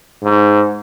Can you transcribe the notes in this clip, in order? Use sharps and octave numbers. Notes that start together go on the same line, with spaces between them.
G#2